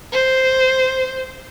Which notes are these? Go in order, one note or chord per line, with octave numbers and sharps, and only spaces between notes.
C5